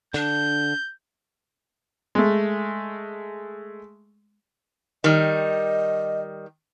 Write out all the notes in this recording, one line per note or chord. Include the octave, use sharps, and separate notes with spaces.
D3 D4 G6
G#3 A3
D#3 G3 D#5